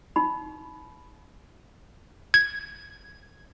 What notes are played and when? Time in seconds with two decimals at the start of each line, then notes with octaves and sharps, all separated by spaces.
0.16 D#4 B5
2.34 G#6